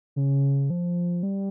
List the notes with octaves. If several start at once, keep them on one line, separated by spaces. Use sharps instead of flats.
C#3
F3
G3